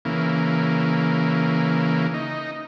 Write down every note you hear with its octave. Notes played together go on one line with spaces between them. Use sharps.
C#3 E3 A#3
D#4